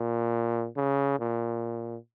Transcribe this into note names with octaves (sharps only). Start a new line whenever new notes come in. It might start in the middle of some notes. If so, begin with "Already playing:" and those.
Already playing: A#2
C#3
A#2